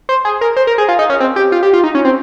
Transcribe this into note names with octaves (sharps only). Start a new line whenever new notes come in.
C5
G#4
A#4
C5
A#4
G#4
F4
D#4
C#4
C4
G4
F4
G4
F4
D#4
C#4
C4